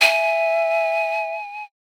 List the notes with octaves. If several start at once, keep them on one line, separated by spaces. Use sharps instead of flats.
E5 G#5